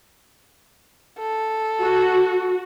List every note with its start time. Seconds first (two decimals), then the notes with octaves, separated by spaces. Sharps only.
1.19 A4
1.81 F#4